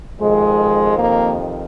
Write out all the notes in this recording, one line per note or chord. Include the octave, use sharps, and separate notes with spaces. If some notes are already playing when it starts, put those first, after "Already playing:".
F2 C3 D#3 G#3
A#3